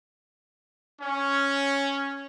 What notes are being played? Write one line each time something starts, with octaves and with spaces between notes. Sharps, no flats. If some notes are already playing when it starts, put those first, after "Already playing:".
C#4